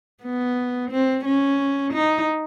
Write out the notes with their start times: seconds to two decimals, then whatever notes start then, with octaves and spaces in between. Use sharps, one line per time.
0.22 B3
0.90 C4
1.25 C#4
1.93 D#4